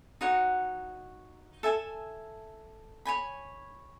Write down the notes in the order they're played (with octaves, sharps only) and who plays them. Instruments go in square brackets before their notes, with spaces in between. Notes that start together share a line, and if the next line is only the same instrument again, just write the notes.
[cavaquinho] D#4 F#4 C#5 F#5
A4 E5 G#5
C#5 G#5 B5